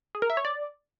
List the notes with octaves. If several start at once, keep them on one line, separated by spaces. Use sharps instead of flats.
G#4
A#4
E5
C#5
D5